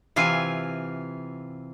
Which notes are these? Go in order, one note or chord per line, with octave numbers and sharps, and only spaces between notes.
C3 E3 F4 G#5